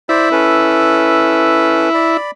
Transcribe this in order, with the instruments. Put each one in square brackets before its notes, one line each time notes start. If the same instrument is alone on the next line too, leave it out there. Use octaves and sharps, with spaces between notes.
[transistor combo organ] E4 [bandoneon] C5 D5 B5
[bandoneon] C#4 A4 B4
D5 B5